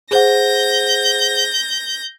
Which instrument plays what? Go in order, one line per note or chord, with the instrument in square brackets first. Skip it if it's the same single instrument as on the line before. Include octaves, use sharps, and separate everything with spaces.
[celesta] G#4 C5 F#5 [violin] G6 A#6